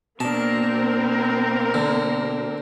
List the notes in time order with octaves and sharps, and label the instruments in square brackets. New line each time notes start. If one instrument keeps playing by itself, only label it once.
[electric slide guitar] B2 D4 [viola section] A#3 C4 A#4 [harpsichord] A5
[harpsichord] D3